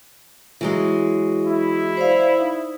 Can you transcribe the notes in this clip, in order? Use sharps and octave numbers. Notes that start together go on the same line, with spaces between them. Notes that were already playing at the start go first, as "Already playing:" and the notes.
E3 F#3 G#3
E4
C5 D5 F5
D#4